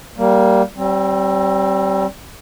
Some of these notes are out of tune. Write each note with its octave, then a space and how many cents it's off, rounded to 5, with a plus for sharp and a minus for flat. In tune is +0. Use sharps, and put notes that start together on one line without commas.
G3 -15 A#3 +0
G3 -25 C4 +30